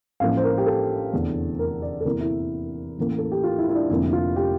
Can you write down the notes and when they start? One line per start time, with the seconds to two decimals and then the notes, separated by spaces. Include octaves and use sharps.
0.20 A1 A2 F3 A#3 F5
0.37 C5
0.44 A#4
0.58 G4
0.66 A4
1.13 F1 E2 D3 A3
1.59 A#4
1.82 D5
2.01 A4
2.05 E2 C3 E3 A#3 A#4
2.20 E4
2.98 A1 A2 E3 A#3
3.18 A4
3.32 G4
3.44 F4
3.59 E4
3.69 E4
3.75 D4
3.90 F1 F2 D3 F3 A#3 E4
4.13 F4
4.36 G4